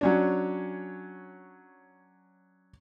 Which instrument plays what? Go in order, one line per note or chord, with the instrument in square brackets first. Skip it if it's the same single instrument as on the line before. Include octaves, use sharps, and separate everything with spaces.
[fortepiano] F#3 C#4 D4